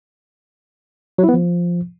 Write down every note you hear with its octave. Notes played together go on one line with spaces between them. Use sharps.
F#3
E4
B3
F3